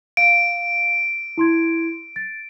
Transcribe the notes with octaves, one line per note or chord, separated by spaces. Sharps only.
F5 D7
E4 C6 G#6
A6